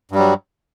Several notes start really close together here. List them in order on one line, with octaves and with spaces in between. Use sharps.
G2 G3 F#3